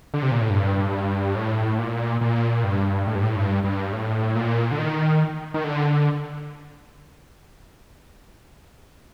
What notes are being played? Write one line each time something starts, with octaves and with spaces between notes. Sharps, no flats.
D3
C3
A#2
A2
G2
A2
A#2
A#2
G2
A2
G2
A2
G2
G2
A2
A#2
D3
D#3
D#3
D3